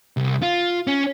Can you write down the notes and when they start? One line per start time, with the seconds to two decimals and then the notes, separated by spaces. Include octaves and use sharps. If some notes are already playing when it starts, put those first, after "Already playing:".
0.17 C2
0.42 F4
0.87 C#4